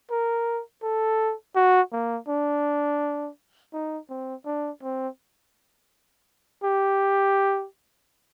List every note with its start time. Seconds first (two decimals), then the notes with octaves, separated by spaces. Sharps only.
0.11 A#4
0.83 A4
1.56 F#4
1.92 A#3
2.29 D4
3.73 D#4
4.09 C4
4.45 D4
4.83 C4
6.64 G4